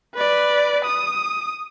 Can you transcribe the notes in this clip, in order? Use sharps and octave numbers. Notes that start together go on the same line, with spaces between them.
B4 D5
D#6